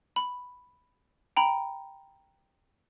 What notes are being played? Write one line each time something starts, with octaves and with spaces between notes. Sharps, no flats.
B5
G5 A#5 B5